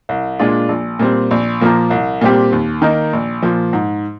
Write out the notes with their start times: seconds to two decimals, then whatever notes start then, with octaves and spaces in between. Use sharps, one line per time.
0.09 C2
0.39 A#2 G#3 D4 F4
0.69 A#1
0.99 A#2 G3 C4
1.31 A#1
1.61 A#2 F3 A#3
1.90 C2
2.21 A#2 G3 C4 G4
2.52 D#2
2.82 D#3 A#3 D#4
3.13 A#1
3.42 A#2 F3
3.73 G#2